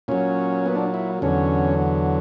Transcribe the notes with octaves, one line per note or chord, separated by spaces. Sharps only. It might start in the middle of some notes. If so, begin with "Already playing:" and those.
A#2 F#3 C#4
B3
D4
E4
E2 D3 F#3 C#4